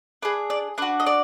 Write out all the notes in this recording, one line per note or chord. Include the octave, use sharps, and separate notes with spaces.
D4 G#4 B4
D5
D4 F#4 B4
D#5
D5